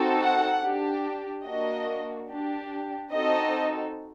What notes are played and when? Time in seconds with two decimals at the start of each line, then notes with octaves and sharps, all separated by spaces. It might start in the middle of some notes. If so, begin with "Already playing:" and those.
Already playing: C4 D#4 F#4 A4
0.19 F#5
0.61 D4 G4
1.44 A#3 D4 F#4 D#5
2.29 D4 G4
3.12 C4 D#4 F#4 A4 D#5